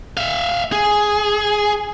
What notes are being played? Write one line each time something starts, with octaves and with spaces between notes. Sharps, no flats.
E5 F5
G#4